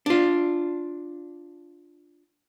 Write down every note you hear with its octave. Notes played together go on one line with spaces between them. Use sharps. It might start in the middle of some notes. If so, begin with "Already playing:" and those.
D4 F4